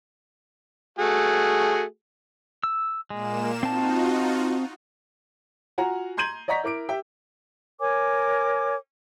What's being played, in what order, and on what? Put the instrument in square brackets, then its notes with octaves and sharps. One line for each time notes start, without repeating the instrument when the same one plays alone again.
[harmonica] A3 F#4 G#4
[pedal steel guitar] E6
[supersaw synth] A#2 A#3 E7 [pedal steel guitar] G#3
[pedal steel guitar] C4 A5 [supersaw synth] D#4 F4 F#4
[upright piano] F4 F#4 F#5 G#5 A#5
A#5 C6 G6 G#6 D#7 F#7
D5 D#5 F#5 A#5 C#6 B6
E4 A#4 D6 D7
G4 E5 G5
[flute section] A#4 C#5 G#5 D6